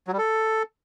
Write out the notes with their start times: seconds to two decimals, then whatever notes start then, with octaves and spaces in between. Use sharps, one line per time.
0.07 F#3
0.13 G3
0.18 A4